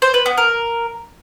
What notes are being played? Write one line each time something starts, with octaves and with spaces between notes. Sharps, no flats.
C5
B4
B3
A#4